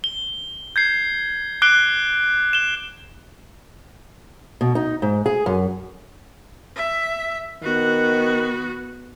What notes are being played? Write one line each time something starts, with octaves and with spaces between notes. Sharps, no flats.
G7
G6 G#6 C7
D6 F#6 C7 D7 G7
E7 G7
B2
D#4
G#2
G#4
F#2
E5
D#3 B3 F#4